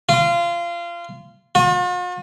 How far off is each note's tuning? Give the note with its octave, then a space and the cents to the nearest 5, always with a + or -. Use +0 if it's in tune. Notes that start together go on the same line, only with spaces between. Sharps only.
F4 -25
F4 +45